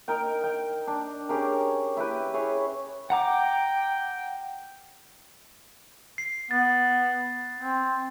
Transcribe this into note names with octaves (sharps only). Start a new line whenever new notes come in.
D#4 A#4 G5
G5
D4
C#4 G4 G#4 A#4
E4 G4 B4
E4 G#4 C#5
F#5 G5 A#5 D6
C7
B3 A6
C4